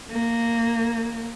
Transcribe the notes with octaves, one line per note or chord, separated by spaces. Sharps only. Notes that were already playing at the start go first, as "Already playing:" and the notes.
A#3